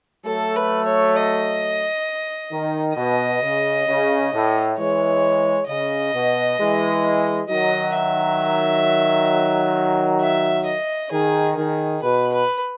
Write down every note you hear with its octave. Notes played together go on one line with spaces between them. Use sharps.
F#3 A3 A4
B4
C#5
D#5
D#3
B2 D#5
C#3
C#3
A2
E3 G#3 C#5
C#3 D#5
B2
E3 G#3
D#3 F#3 D#5
E5
E5
D#5
D#3 G#4
D#3 G#4
B2 B4
B4